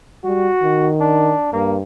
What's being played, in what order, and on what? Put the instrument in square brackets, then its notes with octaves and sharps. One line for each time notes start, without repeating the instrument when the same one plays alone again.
[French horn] G3 [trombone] F#4
[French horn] D#3
[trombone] D4
[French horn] G2 [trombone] A#3